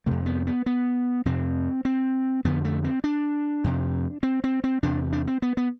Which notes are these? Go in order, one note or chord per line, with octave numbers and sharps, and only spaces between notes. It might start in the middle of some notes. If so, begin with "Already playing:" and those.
F2 C3 A3
B3
B3
B3
F2 C3 C4
C4
F2 D3 B3
A3
C4
D4
F2 C3
C4
C4
C4
E2 C3 D4
D4
C4
B3
B3